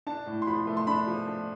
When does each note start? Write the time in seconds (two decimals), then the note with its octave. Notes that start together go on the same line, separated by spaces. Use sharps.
0.07 D4 A5
0.26 A2
0.42 C6
0.47 F3 B5
0.67 A3
0.77 C6
0.87 D4 B5
1.07 F3
1.28 D4